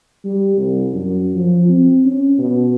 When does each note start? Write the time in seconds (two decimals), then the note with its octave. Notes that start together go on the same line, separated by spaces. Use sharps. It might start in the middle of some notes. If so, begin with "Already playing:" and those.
0.24 G3
0.57 C2
0.93 F#2
1.35 F3
1.69 C4
2.05 C#4
2.38 B2